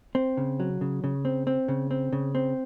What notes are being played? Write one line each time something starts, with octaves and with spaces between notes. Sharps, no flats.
C4
C#3
F#3
C#3
C#3
C4
C4
C#3
C4
C#3
C4